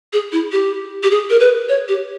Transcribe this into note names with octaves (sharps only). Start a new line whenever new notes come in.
G#4
E4
G4
G4
G#4
A#4
B4
C#5
G4